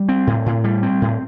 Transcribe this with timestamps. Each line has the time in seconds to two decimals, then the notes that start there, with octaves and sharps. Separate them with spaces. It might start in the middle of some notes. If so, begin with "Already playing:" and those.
Already playing: G3
0.09 C4
0.27 A2
0.46 A2
0.64 G3
0.83 C4
1.02 A2